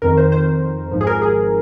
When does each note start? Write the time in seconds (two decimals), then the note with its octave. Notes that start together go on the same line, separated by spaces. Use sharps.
0.02 F2 D#3 A#4
0.17 C5
0.32 C5
0.91 G#1 G#2 F3
1.01 G#4
1.07 A#4
1.22 G#4